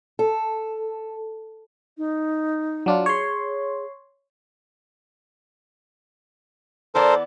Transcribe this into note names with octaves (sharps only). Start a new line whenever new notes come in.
A4
D#4
F#3 D4 F4
G#4 C#5 C6
E3 B3 A4 A#4 C5 D5